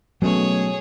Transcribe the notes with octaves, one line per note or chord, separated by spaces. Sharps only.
B2 F#3 A3 C#4 G#4 C#5